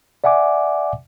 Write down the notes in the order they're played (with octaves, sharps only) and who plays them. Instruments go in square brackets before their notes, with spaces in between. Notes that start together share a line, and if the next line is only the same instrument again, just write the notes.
[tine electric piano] D5 E5 F#5 G#5 D6